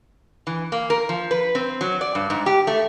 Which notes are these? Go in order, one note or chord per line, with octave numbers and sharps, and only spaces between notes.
E3
A#3
A#4
F3
B4
C4
F#3
D5
G2
G#2
G4
A3